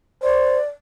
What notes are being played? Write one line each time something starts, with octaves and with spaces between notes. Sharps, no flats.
C5 D5